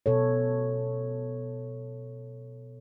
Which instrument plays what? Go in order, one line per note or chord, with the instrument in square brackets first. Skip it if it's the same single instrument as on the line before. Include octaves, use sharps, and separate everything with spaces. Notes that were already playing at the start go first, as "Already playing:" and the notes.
[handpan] B2 A4 C#5